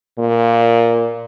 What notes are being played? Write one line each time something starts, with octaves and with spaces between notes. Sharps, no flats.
A#2